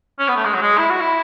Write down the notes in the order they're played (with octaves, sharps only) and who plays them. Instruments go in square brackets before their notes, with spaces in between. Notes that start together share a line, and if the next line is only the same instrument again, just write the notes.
[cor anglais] C#4
B3
A3
G#3
F#3
G#3
E4
F#4
E4